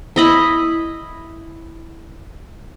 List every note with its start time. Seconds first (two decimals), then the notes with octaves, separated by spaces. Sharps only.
0.16 E4 D#5 B5